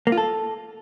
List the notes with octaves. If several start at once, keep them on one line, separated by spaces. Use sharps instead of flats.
A#3
F4
A4